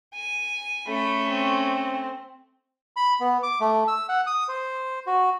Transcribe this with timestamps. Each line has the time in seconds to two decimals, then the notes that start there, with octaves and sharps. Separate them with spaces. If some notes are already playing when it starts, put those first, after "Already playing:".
0.14 G#5
0.88 A3 C#4 B5
1.30 C4
2.96 B5
3.20 B3
3.43 D6
3.60 A3
3.88 E6
4.09 F#5
4.27 D#6
4.49 C5
5.07 F#4